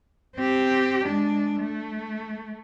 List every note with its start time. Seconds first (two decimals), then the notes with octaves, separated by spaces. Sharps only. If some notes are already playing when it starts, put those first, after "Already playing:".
0.36 C4 G4
1.05 G#3 D4
1.59 A3